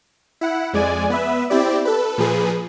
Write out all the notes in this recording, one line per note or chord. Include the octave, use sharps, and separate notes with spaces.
E4 F#5
F2 G#3 D5 G#5
B3 B4 E5
C4 E4 G4 D5
A4 B4
A#2 F3 G#4 B4